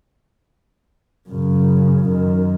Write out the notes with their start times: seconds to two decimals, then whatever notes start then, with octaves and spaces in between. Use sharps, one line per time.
1.29 F#2 C#3
2.04 F#2 D#3